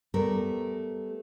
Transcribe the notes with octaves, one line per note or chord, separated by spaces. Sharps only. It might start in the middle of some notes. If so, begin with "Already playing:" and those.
G3 A3 B3 A#4